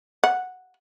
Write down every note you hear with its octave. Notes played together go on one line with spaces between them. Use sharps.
F#5